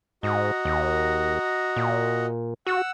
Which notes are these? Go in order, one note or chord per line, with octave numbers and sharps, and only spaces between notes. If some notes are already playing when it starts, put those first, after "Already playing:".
G#2 F#4 D#5 A#5
D#2
A#2
F#4 F#5 E6